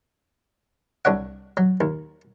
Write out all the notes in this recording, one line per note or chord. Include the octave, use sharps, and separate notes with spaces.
C2 D4 C#5 F#5
F#3
D#2